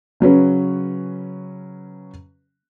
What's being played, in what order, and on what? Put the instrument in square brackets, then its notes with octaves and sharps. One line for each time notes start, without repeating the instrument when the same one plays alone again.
[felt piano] C#3 F#3 C#4 B4